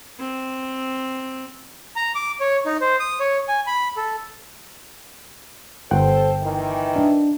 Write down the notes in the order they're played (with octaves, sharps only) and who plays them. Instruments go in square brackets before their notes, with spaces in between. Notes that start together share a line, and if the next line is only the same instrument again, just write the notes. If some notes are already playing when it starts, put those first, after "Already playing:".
[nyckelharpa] C4
[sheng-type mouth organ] A#5
D6
C#5
D#4
C5
D#6
C#5
G#5
B5
A4
[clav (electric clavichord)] G1 F#5 [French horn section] A4 C5 [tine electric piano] G5
[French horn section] D#3 E3
[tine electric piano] D4